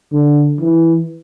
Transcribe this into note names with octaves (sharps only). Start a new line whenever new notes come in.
D3
E3